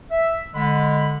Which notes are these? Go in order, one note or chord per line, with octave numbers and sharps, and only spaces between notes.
E5
D3 G#3 B5